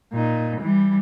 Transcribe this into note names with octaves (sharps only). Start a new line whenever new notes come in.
A#2 D#4
E3 G3